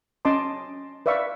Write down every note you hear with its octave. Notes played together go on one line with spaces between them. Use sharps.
C#4 D#5 A5 C6 D6
B4 D5 E5 F5 C#6